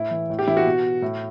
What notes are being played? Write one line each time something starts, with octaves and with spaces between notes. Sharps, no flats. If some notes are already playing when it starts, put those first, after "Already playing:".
Already playing: A2 E4
E3
A2
G4
E3 E4
F#4
B2
A2